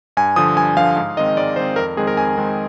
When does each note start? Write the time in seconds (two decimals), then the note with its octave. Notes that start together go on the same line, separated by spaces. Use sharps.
0.17 G2 G#5
0.36 D3 F3 D#6
0.56 G2 G#5
0.76 D3 F3 F5
0.96 G#2 F5
1.17 D#3 G#3 C4 D#5
1.37 G#2 D5
1.56 D#3 G#3 C4 C5
1.76 F2 A#4
1.96 D#3 G#3 C4 G#4
2.07 A#4
2.17 F2 G#5
2.37 D#3 G#3 C4